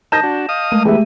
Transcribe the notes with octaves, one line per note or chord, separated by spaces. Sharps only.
D#4 A#4 D#5 A5 G6 A#6 E7
D4 F#4
D#5 F5 D#6
G#3 A3 D#7
E3 B3 G4 G#4 E5